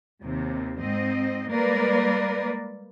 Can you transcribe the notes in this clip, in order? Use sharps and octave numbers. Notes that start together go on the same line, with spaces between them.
D#2 C3
G#2 C4 D#5
G3 G#3 A#3 A#4 B4 D5